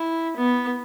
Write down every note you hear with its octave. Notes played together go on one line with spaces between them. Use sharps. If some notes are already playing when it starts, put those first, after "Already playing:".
Already playing: E4
B3